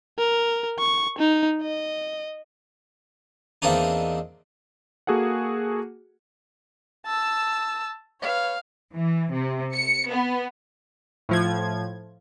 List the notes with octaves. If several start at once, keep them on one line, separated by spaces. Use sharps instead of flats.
A#4
C#6
D#4
D#5
E2 A#3 C4 D4 D#4
A#3 F#4 G#4 A4 F#5
A5 E6
B4 C#5 F5
E3
C3
C#7
B3
A2 F3 G#6